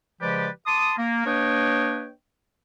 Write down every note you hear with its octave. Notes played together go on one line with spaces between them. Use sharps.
C#3 F3 G#3 G4 B4 D5
A5 C6 D6 D#6
A#3
A#3 D4 B4 C#5 D#5 G5